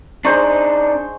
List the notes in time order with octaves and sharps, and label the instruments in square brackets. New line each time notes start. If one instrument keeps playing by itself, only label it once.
[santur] G#3 C5 C#6 [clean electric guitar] D4 D#4